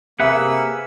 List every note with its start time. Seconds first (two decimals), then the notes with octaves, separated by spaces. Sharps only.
0.20 C3 A#3 G#4 B4 E5 F#5 E6